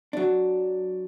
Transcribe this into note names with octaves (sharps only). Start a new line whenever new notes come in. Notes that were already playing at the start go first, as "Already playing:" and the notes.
F#3 D4